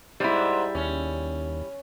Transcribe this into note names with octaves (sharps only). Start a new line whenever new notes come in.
G#2 G3 E4
D#2 C#4